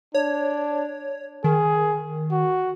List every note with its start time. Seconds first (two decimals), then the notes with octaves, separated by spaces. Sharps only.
0.14 D4 C#5
1.44 D#3 G#4
2.31 F#4